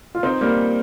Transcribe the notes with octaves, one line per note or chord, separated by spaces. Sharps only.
F4
C4 D#4
G3 A#3